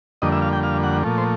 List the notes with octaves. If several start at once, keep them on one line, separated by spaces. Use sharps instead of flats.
F2 D3 G3 A#3 D#5
E5
F5
G5
F5
F#5
A#2 F3 A3
C5